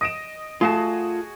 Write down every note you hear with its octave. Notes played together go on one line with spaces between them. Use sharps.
D#5 D#6 D7 E7
A3 F4 F#4 G#4 F5 A5